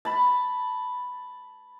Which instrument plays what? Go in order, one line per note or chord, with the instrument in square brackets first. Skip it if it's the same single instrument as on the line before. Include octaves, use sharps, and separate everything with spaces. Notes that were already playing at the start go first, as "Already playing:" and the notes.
[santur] A5 B5